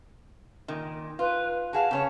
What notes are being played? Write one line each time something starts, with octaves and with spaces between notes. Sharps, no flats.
A#2 D#3
F4 B4
F#4 G#4 F5 A5
C#3 C#4 C#5